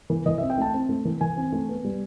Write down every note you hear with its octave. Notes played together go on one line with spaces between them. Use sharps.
E3
E3 D#5
E5
C4
G5
A3 A5
C4
A3
E3
E3 G#5
C4
A3
B3
G3